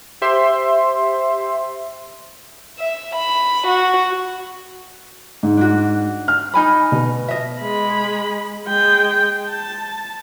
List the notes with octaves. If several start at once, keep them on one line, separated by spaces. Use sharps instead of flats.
G4 C5 E5 C6
E5
B5
F#4
G#2
D4 E4 F#4
F6
D#4 G#5 B5
B2
D#5 E5
G#3 B5
G#3 G5
A5